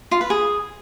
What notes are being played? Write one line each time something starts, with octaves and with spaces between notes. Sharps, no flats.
F4
B4
G#4